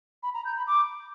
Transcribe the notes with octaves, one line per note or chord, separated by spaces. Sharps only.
B5
A#5
G6
B5
D6